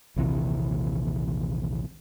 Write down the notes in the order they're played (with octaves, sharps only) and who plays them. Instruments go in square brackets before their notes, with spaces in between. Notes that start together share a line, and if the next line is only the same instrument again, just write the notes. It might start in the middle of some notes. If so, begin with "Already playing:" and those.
[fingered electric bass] A#1 D#2 C3 E3